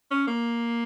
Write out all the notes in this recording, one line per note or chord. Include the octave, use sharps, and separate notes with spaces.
C#4
A#3